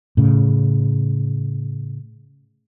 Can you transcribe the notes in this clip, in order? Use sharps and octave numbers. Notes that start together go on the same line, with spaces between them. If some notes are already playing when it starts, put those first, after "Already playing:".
A2 C#3